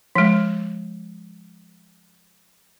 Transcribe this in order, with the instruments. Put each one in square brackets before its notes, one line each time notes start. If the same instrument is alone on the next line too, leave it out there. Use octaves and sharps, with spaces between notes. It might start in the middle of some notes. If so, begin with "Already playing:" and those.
[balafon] F3 G#3